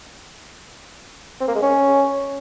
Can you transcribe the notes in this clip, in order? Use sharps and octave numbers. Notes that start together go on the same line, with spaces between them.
C4
A#3
G#3
C#4